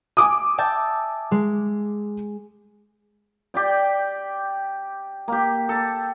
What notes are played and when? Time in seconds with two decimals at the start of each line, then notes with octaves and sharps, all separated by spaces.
0.17 G#5 D6 D#6
0.58 E5 G5 A5
1.31 G#3
3.54 G4 D5 G5
5.28 A#3 G4
5.69 A4